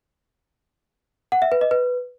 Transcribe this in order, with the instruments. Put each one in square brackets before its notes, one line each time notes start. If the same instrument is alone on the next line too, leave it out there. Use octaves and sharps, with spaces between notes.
[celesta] F#5
E5
B4
D#5
B4